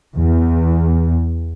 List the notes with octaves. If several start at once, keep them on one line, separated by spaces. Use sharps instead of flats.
E2